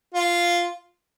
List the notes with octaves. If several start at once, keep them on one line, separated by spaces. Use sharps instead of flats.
F4